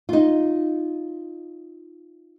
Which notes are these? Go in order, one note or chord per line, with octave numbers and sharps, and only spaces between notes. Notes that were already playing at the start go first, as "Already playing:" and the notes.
D#4 F4